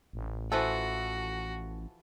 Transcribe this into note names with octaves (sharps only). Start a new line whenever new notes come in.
A1
E3 F3 F#4 A4